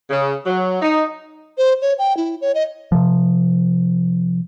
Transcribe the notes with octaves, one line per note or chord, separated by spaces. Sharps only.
C#3
F#3
D#4
C5
C#5
G5
E4
C#5
D#5
C3 F3